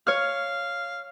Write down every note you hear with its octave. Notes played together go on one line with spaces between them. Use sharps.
C#5 F5 F6